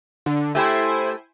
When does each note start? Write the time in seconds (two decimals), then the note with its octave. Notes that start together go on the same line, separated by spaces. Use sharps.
0.26 D3
0.55 A3 E4 G4 C5 G#5